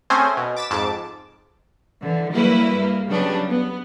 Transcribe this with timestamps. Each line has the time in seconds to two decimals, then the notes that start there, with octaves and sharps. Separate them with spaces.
0.10 A3 C4 C#4 G#4 C5 G#5
0.37 B2
0.56 D6 A6 B6 E7
0.71 F2 G#2 A5 D6
2.03 D3 E3
2.33 F#3 G3 A#3 E4 B4
2.75 G2 A#3
3.09 C#3 F#3 G3 B3 D4
3.48 B3